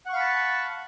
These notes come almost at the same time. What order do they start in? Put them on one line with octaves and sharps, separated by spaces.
F#5 C#6 F5 B5 A5